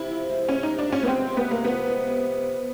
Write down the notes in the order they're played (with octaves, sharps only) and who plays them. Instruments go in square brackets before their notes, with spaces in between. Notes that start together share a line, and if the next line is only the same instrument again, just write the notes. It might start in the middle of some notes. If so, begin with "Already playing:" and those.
Already playing: [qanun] C3 [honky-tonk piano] E4
[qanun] F3
G#3
[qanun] C3 [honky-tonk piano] C#4
[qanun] C3 [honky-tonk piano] D#4
[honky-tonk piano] D4
[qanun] F3 [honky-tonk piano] C#4
[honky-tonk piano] B3
[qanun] G#3 [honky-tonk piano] C4
[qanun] C3
[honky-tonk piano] B3
[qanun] C3 [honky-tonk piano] A#3
[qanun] F3 [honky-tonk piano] B3
[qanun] G#3
C3